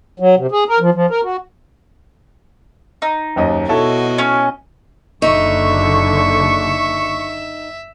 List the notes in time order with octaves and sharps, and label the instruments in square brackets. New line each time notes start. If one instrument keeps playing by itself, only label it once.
[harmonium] F#3
C3
G#4
A#4
F3
F3
A#4
F#4
[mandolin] D#4
[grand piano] F#1 D#2 D#5
[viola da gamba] B2 F#4 D#5 [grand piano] E4 A4 C#5
[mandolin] C#4
[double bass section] F#1 D3 [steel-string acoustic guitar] D#4 [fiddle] E5 [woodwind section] C#6